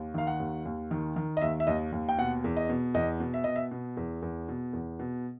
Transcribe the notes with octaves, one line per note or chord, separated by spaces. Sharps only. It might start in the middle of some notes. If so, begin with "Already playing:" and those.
Already playing: D#2
D#3 F5
F#5
D#2
D#2
D#3
D#3
D#5
D#2 E5
E5
D#2 D#5
D#2
G5
B2 F#5
E2
D#5
B2
E2 D#5
B2
E5
B2 D#5
E5
B2
E2
E2
B2
E2
B2